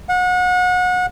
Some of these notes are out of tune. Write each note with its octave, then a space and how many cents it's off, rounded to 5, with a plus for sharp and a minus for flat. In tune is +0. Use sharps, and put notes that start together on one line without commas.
F#5 -30